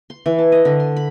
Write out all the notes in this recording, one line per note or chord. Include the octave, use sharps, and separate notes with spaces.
C6
E3
A5
D#5
D3
C6
B5